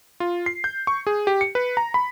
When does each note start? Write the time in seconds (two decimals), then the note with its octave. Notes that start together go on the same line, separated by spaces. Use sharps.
0.20 F4
0.46 C7
0.64 G6
0.87 C#6
1.07 G#4
1.27 G4
1.41 C#7
1.55 B4
1.77 A#5
1.94 B5